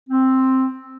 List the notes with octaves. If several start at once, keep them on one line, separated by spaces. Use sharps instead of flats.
C4